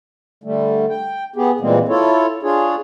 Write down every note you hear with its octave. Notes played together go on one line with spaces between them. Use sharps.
D3 G3 A3
G5
B3 G4 G#4
A#2 E3 G3 G#3 A#3 C4
E4 F4 A4 C#5
D4 F4 G#4 C#5